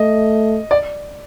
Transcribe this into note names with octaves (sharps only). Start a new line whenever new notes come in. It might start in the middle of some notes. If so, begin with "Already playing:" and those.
Already playing: A3 D#5
D5